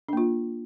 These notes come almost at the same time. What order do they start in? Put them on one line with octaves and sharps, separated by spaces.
D4 A#3 F4